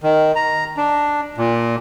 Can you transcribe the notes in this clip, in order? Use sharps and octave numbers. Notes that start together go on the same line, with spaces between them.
D#3
A#5
D4
A#2